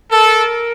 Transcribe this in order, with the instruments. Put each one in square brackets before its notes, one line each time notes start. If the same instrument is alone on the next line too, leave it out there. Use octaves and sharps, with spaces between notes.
[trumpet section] A4 [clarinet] A#4